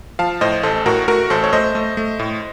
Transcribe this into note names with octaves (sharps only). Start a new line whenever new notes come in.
F3 F5 A5
A2 C5 D#5
A1 A4 C5
A2 F#4 A#4
A3 F#4 A#4
A1 A4 C5
C#5
A3 C5 D#5
A3
A3
A2